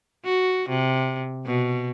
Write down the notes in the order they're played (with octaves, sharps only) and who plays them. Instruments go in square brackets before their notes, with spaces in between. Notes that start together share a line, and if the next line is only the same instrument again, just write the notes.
[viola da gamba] F#4
C3
B2